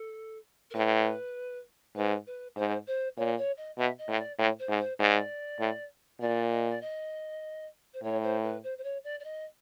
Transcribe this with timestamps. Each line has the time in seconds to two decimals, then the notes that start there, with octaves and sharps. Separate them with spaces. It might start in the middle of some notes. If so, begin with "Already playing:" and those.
Already playing: A4
0.71 A#4
0.74 A2 B4
1.96 G#2 B4
2.27 B4
2.56 G#2 C5
2.87 C5
3.17 A#2 C#5
3.38 C#5
3.58 D#5
3.78 B2 E5
3.98 D#5
4.09 A2
4.18 D5
4.38 A2 C#5
4.59 C5
4.69 G#2
4.79 C5
4.99 G#2 D5
5.60 A2
6.20 A#2 D5
6.51 D#5
6.70 D5
6.81 D#5
7.94 C5
8.03 A2 C#5
8.23 C5
8.43 B4
8.64 C5
8.78 C5
8.84 C#5
9.04 D5
9.20 D5
9.24 D#5